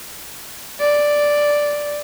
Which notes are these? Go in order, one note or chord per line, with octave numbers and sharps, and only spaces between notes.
D5